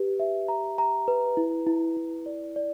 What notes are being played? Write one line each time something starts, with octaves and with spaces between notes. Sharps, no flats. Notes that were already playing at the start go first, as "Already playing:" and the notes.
Already playing: G4 B4
E5
A#5
A#5
B4
E4
E4
E4
D5
D5